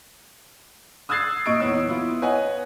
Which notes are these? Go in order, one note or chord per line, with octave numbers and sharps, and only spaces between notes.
D#6 E6 F#6 G#6 A6 C7
A#2 D#5 C#6 D7
E2 A#2 B3 C#5 E6
B3 E4 F4
B4 C#5 D#5 F#5 G#5